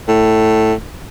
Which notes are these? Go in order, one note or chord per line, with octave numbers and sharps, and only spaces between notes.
A2